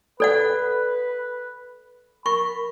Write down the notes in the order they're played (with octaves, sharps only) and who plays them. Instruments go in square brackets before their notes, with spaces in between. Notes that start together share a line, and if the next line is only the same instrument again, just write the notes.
[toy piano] A4 D5 F#5 [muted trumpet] B4
[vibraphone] A#4 [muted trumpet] B5 [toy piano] C#6